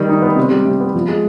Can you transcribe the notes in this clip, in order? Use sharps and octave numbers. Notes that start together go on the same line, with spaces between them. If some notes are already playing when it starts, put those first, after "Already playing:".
Already playing: D#3 G3
D#4
B3
C3
G3
C3
B3
F3
G#3